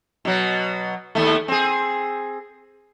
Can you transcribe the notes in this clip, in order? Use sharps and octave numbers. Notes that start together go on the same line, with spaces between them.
B2 F#3
D#2 A3
C4 G#4